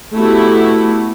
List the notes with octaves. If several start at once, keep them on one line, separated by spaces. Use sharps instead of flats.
A3 B3 E4 F#4 G4